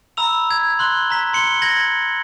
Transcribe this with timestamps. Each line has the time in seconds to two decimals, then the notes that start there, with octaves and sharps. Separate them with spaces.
0.17 A#5 B5 E6 F7
0.51 G#6
0.79 C6 F#6 G7
1.10 A#5 B6
1.33 C6 C#7 G7
1.62 G#6 A#6 F#7